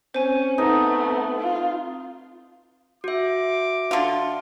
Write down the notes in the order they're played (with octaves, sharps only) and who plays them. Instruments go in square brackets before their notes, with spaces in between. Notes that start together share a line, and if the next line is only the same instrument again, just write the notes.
[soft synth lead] C4 [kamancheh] C#4 [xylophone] C5 G#5
[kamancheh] A3 B3 [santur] D#4 [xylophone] B4
[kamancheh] F4
[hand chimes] F#4 E5 [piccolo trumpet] D6
[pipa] D3 F4